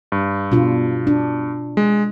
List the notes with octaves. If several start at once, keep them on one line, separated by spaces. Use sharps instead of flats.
G2
B2 D4 F4
D4
G#3